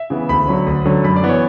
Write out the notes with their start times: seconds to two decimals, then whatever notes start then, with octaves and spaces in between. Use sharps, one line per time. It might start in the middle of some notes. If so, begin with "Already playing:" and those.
Already playing: E5
0.10 C#3 E3 B3
0.29 D2 B5
0.48 D3 F#3 C#4
0.67 D2
0.85 D3 F#3 C#4
1.04 F#2 B5
1.16 D5
1.23 E3 B3
1.29 C#5